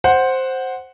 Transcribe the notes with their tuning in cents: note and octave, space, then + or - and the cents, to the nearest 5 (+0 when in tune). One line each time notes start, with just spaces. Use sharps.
C5 +5 F#5 +0